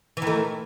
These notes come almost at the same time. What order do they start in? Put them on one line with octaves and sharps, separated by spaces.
E3 D#3 A3